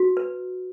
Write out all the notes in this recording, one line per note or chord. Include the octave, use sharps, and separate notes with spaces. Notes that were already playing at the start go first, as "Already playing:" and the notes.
Already playing: F#4
B4